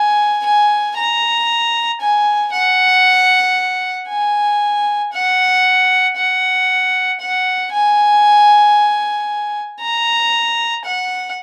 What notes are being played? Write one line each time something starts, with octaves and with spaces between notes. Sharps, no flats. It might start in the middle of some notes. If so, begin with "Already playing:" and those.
Already playing: G#5
G#5
A#5
G#5
F#5
G#5
F#5
F#5
F#5
G#5
A#5
F#5